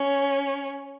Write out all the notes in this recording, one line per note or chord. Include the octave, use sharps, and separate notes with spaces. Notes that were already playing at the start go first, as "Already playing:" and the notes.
Already playing: C#4 C#5